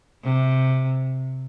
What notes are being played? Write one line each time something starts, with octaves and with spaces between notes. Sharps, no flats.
C3